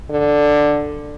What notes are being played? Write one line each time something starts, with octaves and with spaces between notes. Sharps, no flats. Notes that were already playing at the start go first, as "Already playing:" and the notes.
D3